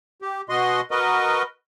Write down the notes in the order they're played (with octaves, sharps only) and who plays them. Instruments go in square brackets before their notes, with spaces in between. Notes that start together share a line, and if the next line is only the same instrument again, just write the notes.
[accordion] G4
B2 F#4 D#5 C6
F#4 A#4 B4 D#5